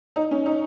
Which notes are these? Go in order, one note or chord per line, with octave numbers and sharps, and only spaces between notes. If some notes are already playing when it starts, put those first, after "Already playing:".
D#4
C#4
D#4